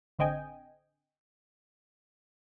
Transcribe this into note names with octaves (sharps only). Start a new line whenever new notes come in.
A1 D3 C4 D#5 G5 G#5